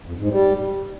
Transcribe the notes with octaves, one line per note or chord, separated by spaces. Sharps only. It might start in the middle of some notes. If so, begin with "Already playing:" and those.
F2
G#2
G3